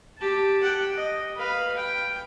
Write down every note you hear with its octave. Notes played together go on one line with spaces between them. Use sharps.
G4 A5
F#5 G5
D#5
B4 F5
G5